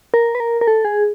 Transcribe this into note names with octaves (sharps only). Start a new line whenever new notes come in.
A#4
B4
A#4
A#4
A4
G#4